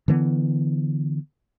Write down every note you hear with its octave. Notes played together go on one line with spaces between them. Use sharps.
D3 E3 A3 B3